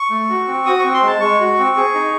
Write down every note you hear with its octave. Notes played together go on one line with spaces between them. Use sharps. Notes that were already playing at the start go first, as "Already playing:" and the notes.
Already playing: C#6
A3
F#4
C4
F#4 D#6
C4 C#6
C6
G#3 A5
G#3 C#6
F#4
C4
G#4
D#4